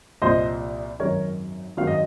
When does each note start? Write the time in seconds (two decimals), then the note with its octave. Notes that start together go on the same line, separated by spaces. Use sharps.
0.22 C2 A#2 F3 C5 D#5
0.99 G#1 F#2 D#3 F#3 A#4 C#5
1.77 G#1 F#2 D#3 F#3 F5
1.87 D#5